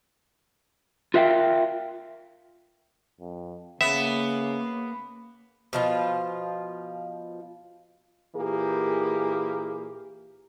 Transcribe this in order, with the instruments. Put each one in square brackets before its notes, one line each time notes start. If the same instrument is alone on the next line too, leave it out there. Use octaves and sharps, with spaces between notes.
[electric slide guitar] F4 A#4 E5 F5 G5
[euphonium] F2
[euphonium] C#3 [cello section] A#3 [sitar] B3 [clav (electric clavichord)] E5
[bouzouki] B2 F3 F4
[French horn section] A#2 E3 A#3 G4 G#4